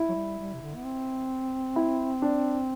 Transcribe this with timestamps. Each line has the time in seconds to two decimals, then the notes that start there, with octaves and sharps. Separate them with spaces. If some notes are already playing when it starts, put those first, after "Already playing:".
Already playing: E4
0.09 F#3
0.15 G3
0.39 G3
0.54 C3
0.62 D3
0.76 B3
0.84 C4
1.76 E4
2.22 D4